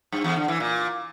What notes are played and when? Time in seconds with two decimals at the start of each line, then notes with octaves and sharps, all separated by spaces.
0.12 G2
0.24 E2
0.36 D3
0.48 E3
0.60 A#2